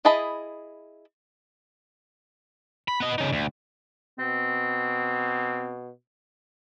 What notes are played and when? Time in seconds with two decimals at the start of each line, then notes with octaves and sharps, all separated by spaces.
0.05 E4 G#4 D#5 A5 B5
2.88 B5
3.00 B3 D#5
3.18 C#3 D#4
3.33 D2
4.19 B2 C4